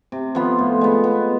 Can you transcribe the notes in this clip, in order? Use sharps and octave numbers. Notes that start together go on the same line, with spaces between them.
C3
F3 B3 F4
A2
G#3 B3
B3